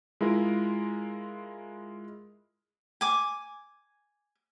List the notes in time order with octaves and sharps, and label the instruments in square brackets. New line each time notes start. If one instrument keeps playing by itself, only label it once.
[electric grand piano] G#3 E4 F4 A#4
[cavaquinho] G#5 D6